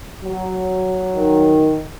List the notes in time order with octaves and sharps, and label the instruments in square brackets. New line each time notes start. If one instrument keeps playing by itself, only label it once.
[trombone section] F#3
[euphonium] D#3